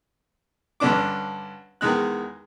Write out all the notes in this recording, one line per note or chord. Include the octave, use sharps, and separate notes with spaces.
G2 D3 C#4 D4 D6
E2 D#3 G#3 F#6